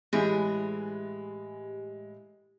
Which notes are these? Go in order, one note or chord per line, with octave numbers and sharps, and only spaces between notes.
A2 E3 G#3 G4 G#4